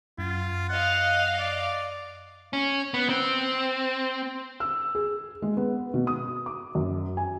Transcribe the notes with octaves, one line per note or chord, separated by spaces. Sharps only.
F#2 F4 A6
D#5 F5 F#5
D5
C#4
B3
C4
E6
G#4
G#3
B3
B2
D#6
D6
F#2
G#5